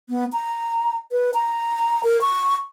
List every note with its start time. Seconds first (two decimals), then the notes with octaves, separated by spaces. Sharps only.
0.09 B3
0.33 A#5
1.12 B4
1.34 A#5
2.03 A#4
2.21 C#6